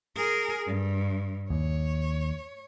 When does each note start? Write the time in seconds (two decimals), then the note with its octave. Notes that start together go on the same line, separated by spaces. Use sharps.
0.16 G#4 A#4
0.66 G2
1.50 D#2 C#5